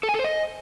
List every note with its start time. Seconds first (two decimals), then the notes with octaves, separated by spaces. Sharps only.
0.03 A4
0.09 G#5
0.14 A4
0.19 C5
0.24 D#5